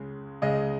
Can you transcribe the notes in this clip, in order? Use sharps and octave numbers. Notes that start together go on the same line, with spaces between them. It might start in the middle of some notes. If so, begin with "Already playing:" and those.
Already playing: C#2 C#3 G#3
C#2 C#3 G#3 D#5